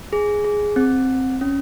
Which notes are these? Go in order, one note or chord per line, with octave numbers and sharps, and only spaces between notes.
G#4
G#4
C4
C#4